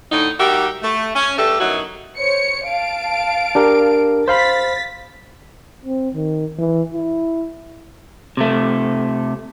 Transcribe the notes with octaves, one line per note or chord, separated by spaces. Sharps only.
A2 D3 D#4
G3 D#4 F#4 G4 A#4 E5
A3
C#4
G2 D3 A3 G4 A4
F#2 B2 F#3 D#4 E4 F#4
C5 C#5 C#7
F5 A5 D7
D4 G4 A#4
C5 F5 B5 A6 B6
C4
D#3
E3
E4
C3 A3